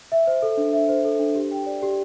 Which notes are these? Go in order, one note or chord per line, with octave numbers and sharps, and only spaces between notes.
E5
C5
A4
D4
E5
C5
A4
D4
G4
G5
D5
G4